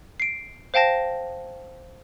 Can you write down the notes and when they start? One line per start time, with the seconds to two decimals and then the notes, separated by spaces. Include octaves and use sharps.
0.20 C7 D7
0.74 C5 F5 G5 A5 A#6